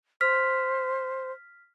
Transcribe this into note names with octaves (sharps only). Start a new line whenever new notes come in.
C5 F6 B6